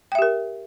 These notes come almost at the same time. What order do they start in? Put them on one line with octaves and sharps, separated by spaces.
G5 E5 G4 A#4